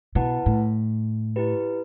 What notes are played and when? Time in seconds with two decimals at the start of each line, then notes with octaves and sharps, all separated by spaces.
0.15 B2 E4 B4 F#5 A5
0.46 A2
1.36 E4 G4 B4